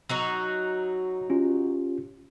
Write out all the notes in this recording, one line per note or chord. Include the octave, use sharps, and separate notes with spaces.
F#3 D#4 F#4 E6
C#4 F4 G4